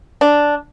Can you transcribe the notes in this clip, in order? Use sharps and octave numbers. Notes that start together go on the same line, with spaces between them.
D4